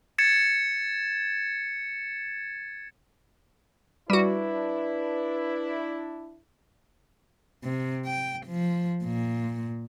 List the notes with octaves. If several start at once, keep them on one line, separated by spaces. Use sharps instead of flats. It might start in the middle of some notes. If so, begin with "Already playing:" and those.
G#6 A6 C#7 E7
G3 D4 E4 F#4 B4
C3
G5
F3
A#2